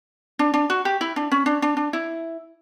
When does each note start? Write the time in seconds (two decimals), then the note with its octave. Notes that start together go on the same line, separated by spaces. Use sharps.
0.39 D4
0.54 D4
0.70 F#4
0.85 G4
1.01 E4
1.16 D4
1.32 C#4
1.46 D4
1.62 D4
1.77 D4
1.93 E4